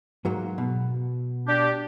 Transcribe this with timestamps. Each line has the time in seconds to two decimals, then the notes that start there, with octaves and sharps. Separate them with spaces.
0.25 G#2 F#3 A#3
0.58 B2
1.47 D4 G4